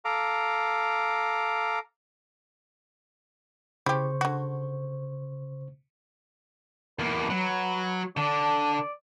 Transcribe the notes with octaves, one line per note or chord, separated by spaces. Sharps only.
A4 F5 A#5 D6
C#3 E4 G4 C5 C#6
D3 F#4
E2 A#3 B4
F#3
D3 D4
D5